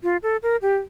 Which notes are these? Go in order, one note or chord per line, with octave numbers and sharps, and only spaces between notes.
F4
A4
A#4
G4